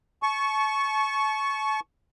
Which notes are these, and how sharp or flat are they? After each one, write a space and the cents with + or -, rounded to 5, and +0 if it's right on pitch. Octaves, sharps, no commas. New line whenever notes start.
A5 -35 C#6 +0